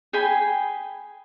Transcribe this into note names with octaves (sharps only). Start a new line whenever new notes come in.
G#4 G5 G#5 B5